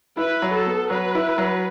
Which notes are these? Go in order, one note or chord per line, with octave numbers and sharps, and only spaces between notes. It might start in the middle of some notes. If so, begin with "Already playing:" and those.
E4 B4
F#3
A4
B3
F#3 B4
E4
F#3